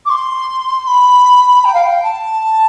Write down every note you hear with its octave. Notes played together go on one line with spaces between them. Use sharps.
D6
C6
B5
G5
F5
G5
A5